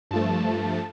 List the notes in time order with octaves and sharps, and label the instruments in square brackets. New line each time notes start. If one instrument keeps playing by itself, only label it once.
[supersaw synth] G2 F3 A3 A5